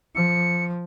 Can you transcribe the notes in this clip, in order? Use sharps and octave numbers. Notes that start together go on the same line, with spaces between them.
F3 C#7